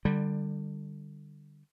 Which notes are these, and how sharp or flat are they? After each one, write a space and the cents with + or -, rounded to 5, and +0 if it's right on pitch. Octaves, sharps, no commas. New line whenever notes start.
D3 +25 G3 +5